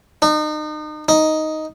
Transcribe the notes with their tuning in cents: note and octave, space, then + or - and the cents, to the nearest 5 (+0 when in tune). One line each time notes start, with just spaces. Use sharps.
D#4 -35
D#4 +5